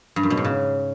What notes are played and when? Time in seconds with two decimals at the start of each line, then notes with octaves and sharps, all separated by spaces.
0.16 G2
0.23 F#2
0.30 B2
0.37 G#2
0.44 C#3